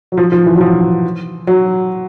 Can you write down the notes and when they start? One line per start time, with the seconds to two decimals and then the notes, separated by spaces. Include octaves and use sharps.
0.12 F#3
0.17 F3
0.32 F3
0.46 E3
0.55 F#3
0.61 F3
1.47 F#3